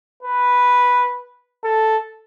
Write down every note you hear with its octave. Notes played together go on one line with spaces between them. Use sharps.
B4
A4